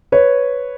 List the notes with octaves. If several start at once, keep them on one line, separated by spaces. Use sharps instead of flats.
B4 C#5